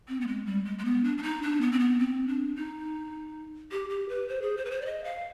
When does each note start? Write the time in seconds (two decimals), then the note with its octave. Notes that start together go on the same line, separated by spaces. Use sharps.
0.08 C4
0.21 B3
0.27 G#3
0.46 G3
0.65 G#3
0.79 G#3
0.85 B3
1.04 D4
1.18 D4
1.23 D#4
1.42 D4
1.61 B3
1.72 C4
1.79 B3
1.99 C4
2.28 D4
2.56 D#4
3.72 G4
3.90 G4
4.09 B4
4.29 C5
4.42 G#4
4.57 C5
4.65 B4
4.71 C5
4.82 D5
4.86 D#5
5.04 F5